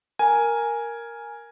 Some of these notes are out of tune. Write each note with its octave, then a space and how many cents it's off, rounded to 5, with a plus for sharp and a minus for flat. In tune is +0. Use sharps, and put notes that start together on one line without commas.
A#4 +0 G#5 +0